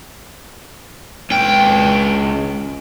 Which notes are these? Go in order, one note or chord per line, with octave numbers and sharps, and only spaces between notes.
C#2 G5